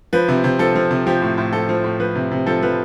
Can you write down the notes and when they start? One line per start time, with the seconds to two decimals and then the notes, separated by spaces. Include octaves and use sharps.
0.13 F3 B4
0.28 C3
0.44 C3
0.59 F3 A4
0.75 F3
0.91 C3
1.06 F3 G4
1.22 A2
1.38 A2
1.53 F3 A4
1.69 F3
1.84 A2
2.00 F3 B4
2.15 C3
2.31 C3
2.46 F3 A4
2.62 F3 B4